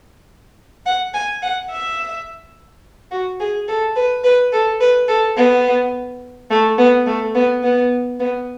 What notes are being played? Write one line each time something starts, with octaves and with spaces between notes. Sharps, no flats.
F#5
G#5
F#5
E5
F#4
G#4
A4
B4
B4
A4
B4
A4
B3
A3
B3
A3
B3
B3
B3